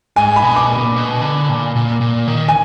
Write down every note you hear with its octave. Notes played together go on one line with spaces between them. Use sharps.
G#2 G#5
B5
B2
D6
A#2
B2
A#2
B2
D3
A#2
A#2
A#2
D#3
G#5